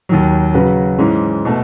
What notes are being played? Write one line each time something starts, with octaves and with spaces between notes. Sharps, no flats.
D#2 D#3 F#3
C#3 F#3 C#4 F#4 B4
G#2 E3 G#3 C#4
B2 A3